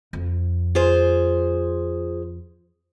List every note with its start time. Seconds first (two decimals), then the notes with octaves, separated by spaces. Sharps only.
0.13 F2
0.75 F4 G#4 C5